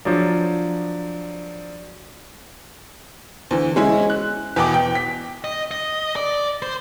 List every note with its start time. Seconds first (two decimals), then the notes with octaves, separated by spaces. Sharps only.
0.05 F3 F#3 D4
3.51 D2 E3
3.76 G#3 C#4 E4
4.10 F#6
4.56 E2 B2 B3 G5 D6
4.74 G5
4.95 B6
5.44 D#5
5.71 D#5
6.16 D5
6.62 C5